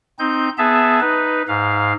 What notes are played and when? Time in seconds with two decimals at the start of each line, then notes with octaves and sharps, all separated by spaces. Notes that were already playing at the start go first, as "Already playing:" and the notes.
0.19 C4 D#4 G6
0.58 B3 G#4 E5 A5
1.00 D#4 B4
1.48 G#2 F5